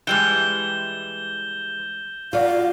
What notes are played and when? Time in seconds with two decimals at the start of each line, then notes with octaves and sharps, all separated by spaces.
0.07 E3 G3 G#3 G6 E7 G7
2.33 F4 F#4 D5 F5